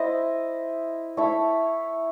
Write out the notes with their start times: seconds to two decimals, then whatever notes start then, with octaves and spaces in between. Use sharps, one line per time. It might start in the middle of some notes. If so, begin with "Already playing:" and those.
Already playing: E4 C5 D#5
1.17 E4 A4 C#5 E5